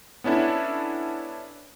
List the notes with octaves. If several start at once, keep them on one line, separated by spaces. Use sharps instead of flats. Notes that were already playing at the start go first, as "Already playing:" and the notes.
B3 C#4 D4 E4 A4